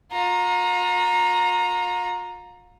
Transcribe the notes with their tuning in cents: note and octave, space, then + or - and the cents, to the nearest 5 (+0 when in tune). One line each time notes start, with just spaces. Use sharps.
F4 +45 A#5 +0